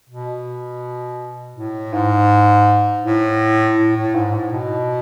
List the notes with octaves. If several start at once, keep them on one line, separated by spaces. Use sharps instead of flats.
B2
A2
G#2
A2
A2
A2
G#2
A2
B2